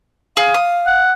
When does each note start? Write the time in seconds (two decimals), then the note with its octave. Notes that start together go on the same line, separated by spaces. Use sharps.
0.37 G#4 F5
0.54 D#6
0.86 F#5